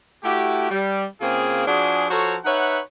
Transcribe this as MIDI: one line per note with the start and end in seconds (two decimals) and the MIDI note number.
0.23 0.69 57
0.23 0.69 64
0.23 0.69 66
0.23 0.69 67
0.70 1.04 55
1.20 1.63 49
1.20 1.63 58
1.20 1.63 60
1.20 1.63 65
1.20 1.63 68
1.66 2.05 53
1.66 2.05 62
1.66 2.05 66
1.66 2.05 68
2.10 2.36 53
2.10 2.36 66
2.10 2.36 69
2.10 2.36 72
2.10 2.36 73
2.10 2.36 82
2.44 2.79 63
2.44 2.79 71
2.44 2.79 73
2.44 2.79 76
2.44 2.79 78